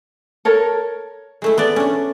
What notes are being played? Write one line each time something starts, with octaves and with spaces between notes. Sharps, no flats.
A4 A#4 C#5
G#3 A3 E4
B3 D5
C#4 D4